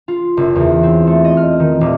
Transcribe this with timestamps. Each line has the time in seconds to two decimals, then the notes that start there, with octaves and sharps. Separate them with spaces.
0.08 F4
0.37 F#1
0.56 E2
0.83 C4
1.07 A3
1.25 D#5
1.37 F6
1.60 D#3
1.81 D#1